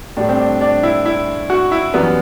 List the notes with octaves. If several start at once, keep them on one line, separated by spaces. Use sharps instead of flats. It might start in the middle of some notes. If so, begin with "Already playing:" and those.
A2 G3 D4
C4
D4
D4
E4
E4
F#4
E4
F#2 E3 G3 B3